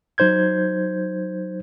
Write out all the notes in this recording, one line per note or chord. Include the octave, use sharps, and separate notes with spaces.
F#3 D#4 C5 G6 G#6